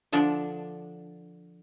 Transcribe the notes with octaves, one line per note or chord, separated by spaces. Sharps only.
D3 F3 D4